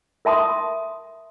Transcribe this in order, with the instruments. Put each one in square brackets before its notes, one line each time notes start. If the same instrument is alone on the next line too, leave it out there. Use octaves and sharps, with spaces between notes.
[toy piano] A#4 E5 A5 C6 D#6